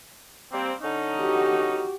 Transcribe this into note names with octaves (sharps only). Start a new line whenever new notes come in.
G3 A#3 C4
D3 C#4 D#4
F#4 G4